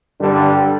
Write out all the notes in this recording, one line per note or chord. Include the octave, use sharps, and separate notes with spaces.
G2 D3 G3